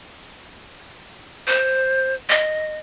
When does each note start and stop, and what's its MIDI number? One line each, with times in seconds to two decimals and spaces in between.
1.47 2.15 72
2.30 2.79 75